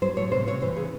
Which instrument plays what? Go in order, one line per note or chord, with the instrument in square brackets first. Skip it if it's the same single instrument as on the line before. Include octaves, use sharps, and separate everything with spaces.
[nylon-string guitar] F#3 C5
A2 C#5
C3 C5
C3 C#5
E3 C5
C#3 G#4